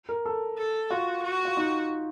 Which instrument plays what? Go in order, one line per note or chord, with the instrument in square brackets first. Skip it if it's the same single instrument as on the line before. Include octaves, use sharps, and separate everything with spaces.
[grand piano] A#4
A4
[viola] A4
[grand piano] F4 [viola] F#4
[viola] F#4
[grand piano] F4
D#4